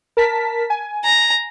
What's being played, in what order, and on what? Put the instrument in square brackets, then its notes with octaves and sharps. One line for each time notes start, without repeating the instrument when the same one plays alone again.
[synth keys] A#4 A5 B6
G#5
[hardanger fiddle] A#5